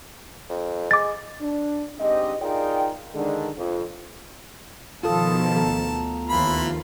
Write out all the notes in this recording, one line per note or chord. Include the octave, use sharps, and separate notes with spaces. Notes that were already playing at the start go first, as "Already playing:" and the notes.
F2
G#3 D6 A6
D4
G#2 C4 D4 G4 D#5
D#4 F4 G#4 A#4 D5 G5
D3 D#3 G#3 D4
F2 F3
B2 D#3 F3 F4 A4 A5 D#6
D2 B3 A4 A#5
D#2 E3 F3 F4 B5